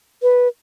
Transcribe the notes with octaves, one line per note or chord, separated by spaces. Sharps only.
B4